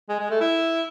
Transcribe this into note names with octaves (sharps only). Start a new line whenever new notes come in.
G#3
G#3
A3
E4